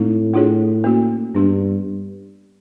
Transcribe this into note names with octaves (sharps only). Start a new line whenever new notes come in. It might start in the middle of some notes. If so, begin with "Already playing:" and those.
Already playing: A2 G#3 C4 D#4
A3 D4 F4 G#4 C#5
A#3 C#4 F#4
G2 B3 D4 G4